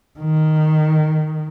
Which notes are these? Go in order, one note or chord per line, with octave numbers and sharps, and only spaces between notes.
D#3